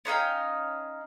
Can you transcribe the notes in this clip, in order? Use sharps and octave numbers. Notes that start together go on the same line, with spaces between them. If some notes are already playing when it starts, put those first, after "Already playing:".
C#4 D#4 F5 G5